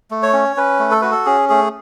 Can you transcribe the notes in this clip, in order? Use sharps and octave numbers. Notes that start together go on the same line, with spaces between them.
A3
C#5
C#4
C#4 B4
A3
A4
F#4 B4
A4
C#4 G#4
A3 G#4